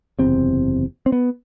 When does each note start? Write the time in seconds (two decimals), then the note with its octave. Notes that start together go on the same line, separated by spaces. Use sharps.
0.19 F#1 E2 C3 C4
1.06 C4
1.12 B3